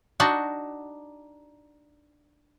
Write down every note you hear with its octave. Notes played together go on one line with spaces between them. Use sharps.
D4 D#4 F#4